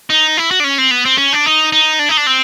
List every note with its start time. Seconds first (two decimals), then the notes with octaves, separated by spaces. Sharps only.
0.10 D#4
0.37 E4
0.51 F#4
0.60 D4
0.64 C#4
0.78 C4
0.91 B3
1.05 C4
1.18 C#4
1.33 D4
1.46 D#4
1.72 D#4
1.99 D4
2.09 D#4
2.17 D4
2.27 C4